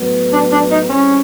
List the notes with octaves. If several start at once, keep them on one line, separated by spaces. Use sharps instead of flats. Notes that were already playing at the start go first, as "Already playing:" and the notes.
Already playing: A2 F#3 B3
D4
D4
D#4
G3 C4 C#4 E4 G#4